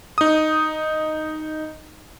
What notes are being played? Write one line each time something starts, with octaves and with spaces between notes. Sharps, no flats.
D#4 D#6